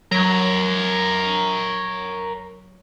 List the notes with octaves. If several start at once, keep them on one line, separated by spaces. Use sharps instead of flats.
F#3 A#4 C#5